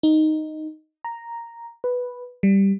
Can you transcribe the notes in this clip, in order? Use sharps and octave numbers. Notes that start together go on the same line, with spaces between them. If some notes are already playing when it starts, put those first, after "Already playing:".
D#4
A#5
B4
G3